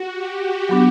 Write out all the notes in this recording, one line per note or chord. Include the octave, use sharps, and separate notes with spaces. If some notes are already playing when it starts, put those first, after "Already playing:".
Already playing: F#4
G4
F#3 B3 D4